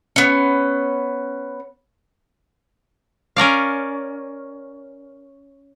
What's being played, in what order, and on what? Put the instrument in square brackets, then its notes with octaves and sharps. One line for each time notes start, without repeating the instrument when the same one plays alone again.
[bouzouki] B3 C#4
[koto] C#4 A#4 D5 F5